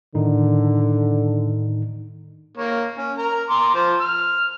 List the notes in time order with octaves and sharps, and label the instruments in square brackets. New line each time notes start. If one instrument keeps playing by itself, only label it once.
[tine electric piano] A2 D#3 D#4 [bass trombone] D3
[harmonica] A#3 C#5
C#4
A#4 A#5
A#5 C6 D6
F3 C5
F6